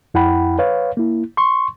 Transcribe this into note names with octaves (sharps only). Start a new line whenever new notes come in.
F2 E4 F#5 G5 B5
B4 C#5 F5
A#3 E4
C6 C#6